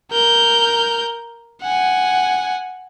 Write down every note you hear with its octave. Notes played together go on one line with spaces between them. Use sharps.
A#4 G6
F#5 G#5